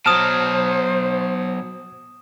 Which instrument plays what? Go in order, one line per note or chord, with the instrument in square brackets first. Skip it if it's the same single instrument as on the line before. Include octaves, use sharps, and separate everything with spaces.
[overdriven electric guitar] B2 F#3 [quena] C5 [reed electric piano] A5 F6 [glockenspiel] D#6 E7